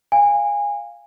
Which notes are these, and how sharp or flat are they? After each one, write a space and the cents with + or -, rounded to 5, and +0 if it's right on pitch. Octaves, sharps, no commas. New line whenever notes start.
F5 +0 G#5 -25